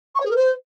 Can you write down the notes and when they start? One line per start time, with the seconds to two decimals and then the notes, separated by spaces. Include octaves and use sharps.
0.15 C#6
0.20 C#5
0.25 G#4
0.30 A#4
0.36 C5